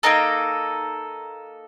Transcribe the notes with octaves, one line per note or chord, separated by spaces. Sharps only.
A#3 D#4 A4 A#5